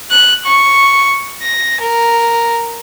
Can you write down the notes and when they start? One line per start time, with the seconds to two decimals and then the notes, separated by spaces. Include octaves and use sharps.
0.11 F#6
0.46 C#6
1.42 A#6
1.81 A#4